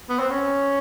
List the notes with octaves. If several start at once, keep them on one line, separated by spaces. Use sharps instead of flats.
B3
C4
C#4